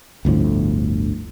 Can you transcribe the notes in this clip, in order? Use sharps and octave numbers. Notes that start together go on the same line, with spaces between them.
G1 D2 A2 F3